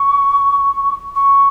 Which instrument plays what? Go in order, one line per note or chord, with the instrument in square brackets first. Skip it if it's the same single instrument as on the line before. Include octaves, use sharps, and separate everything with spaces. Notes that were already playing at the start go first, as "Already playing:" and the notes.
Already playing: [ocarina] C#6
C#6